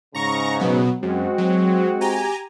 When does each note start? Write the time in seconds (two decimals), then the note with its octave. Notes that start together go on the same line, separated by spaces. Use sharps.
0.15 G#2 C#3 A#5 C#6 A#6
0.60 B2 F#3 B3
1.03 F#2 G#3 C4 F#4
1.38 F#3
2.01 G4 G#5 A#5